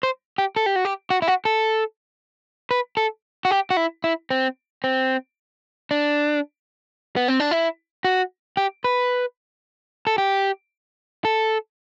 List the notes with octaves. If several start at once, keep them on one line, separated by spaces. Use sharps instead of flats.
C5
G4
A4
G4
F#4
G4
F#4
E4
F#4
A4
B4
A4
F#4
G4
F#4
E4
E4
C4
C4
D4
B3
C4
D4
E4
F#4
G4
B4
A4
G4
A4